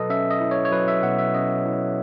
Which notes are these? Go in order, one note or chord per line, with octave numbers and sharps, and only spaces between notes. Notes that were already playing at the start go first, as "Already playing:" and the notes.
Already playing: B2 F#3 A4 B4 D#5
C#4 E5
D#5
E4
C#5
C#5
F#3 B4
E5
B2 F#5
E5
C#4 D#5
E4